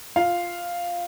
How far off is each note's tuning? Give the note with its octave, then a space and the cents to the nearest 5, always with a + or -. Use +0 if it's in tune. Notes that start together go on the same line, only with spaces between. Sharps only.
F4 +0 F5 +0